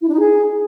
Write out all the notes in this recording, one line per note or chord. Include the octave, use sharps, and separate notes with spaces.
E4
D4
D#4
G#4